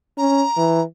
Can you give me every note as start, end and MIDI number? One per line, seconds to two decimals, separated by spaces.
0.18 0.44 61
0.18 0.82 82
0.57 0.82 52